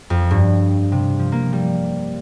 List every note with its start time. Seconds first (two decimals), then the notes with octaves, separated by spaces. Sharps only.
0.10 F2
0.31 G2
0.92 C3
1.19 F3
1.32 A#3
1.53 G3